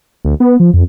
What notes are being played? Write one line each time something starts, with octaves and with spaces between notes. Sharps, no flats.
D2
B3
F3
F2